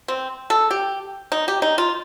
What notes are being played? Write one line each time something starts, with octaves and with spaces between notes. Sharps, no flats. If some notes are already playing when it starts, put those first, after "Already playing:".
C4
A4
G4
D#4
G4
D#4
F4